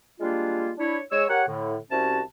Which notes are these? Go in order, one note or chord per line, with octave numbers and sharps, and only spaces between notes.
G3 G#3 A#3 D4 F4
D4 E4 C#5
G#3 C#5 E6
G4 A#4 C#5 F#5
A2 D3
C2 C3 C#4 F#4 A5